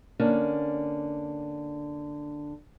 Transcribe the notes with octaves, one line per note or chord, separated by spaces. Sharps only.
D3 A#3 C#4 D4